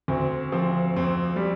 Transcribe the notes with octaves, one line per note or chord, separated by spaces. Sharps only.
D2 C4
F3 C4
F2 C4
G3